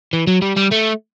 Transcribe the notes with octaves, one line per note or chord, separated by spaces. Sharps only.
E3
F#3
G3
G3
A3